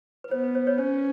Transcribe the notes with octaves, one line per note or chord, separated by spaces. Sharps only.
B4
B3 C5
B4
C5
B4 C#5
C#4 C5